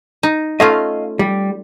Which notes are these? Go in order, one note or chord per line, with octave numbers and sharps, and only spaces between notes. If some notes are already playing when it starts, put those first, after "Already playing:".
D#4
A3 C#4 F4 D#5 F5
G3